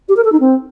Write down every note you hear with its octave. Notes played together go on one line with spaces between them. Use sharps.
G4
A#4
A4
D#4
C4